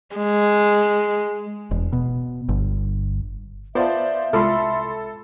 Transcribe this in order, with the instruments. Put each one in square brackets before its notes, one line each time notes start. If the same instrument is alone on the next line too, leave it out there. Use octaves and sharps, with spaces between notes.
[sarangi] G#3
[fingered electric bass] E1
B2
G1
[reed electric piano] B3 [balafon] F4 A5 [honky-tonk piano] C5 D5 F5 [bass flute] E5
[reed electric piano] C2 B5 C6 [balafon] G#3 F4 [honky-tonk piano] A4